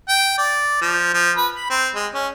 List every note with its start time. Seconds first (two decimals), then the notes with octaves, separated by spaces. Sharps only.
0.09 G5
0.38 D5
0.81 F3
1.14 F3
1.37 B4
1.56 B5
1.70 C4
1.95 G#3
2.14 C#4